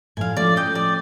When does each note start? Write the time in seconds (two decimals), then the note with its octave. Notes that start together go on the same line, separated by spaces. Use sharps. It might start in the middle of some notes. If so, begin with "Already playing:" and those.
0.17 A2 F3 D4 F5 G#5
0.36 F3 A3 C#4 D5
0.56 D#5 G5
0.75 D5